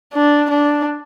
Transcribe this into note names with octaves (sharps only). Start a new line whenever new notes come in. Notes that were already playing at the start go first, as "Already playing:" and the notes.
D4
D4